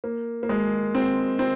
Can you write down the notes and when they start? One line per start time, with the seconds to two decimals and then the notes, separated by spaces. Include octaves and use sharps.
0.04 A#3
0.43 A#3
0.49 G#3
0.95 C4
1.39 C4